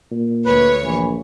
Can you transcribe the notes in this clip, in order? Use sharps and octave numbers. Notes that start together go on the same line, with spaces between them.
A#2
D2 B4 C#5
A#1 E3